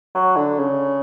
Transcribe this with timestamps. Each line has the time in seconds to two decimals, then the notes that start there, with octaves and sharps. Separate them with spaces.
0.15 F#3
0.36 D3
0.59 C#3